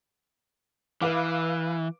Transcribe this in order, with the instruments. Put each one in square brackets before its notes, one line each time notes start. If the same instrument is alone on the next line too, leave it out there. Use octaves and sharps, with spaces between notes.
[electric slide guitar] E3 [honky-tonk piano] B4 F5 D6